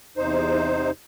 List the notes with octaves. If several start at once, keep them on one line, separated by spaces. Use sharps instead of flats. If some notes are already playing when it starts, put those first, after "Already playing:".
E2 C3 D#4 C5